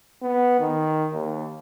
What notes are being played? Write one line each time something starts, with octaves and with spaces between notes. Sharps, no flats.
B3
D#3
D#2